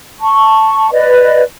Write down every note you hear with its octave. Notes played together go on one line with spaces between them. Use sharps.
A5 C#6
B4 D5 D#5